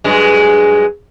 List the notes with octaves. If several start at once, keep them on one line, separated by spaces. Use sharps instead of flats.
G2 F#3 G#3